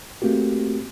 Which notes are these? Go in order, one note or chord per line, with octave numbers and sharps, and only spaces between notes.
A3 A#3 C4 F#4 G4